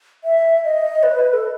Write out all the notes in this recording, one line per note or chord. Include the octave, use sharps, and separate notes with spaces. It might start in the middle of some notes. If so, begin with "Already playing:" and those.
E5
D#5
B4
A4